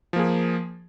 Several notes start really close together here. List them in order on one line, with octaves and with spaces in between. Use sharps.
F3 A#3 G#4